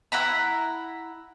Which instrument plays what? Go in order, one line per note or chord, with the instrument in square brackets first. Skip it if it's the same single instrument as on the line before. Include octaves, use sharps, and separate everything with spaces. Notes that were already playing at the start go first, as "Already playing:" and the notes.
[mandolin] E4 F#5 A#5 B5